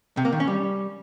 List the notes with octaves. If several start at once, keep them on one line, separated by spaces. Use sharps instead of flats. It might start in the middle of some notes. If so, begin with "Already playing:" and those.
C3
A#3
D#3
C#4
G3